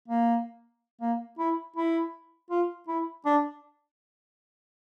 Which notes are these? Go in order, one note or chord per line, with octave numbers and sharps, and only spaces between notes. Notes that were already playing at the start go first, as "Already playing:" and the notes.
A#3
A#3
E4
E4
F4
E4
D4